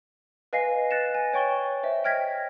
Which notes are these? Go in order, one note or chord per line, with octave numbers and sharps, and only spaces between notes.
B4 D#5 F5 G#5 A#6 C7
F#6 A6 A#6 C#7 E7
G#5
C#5 G5 C#6 A6 G7
C5 D#5 E5
G5 F6 G#6 A#6 B6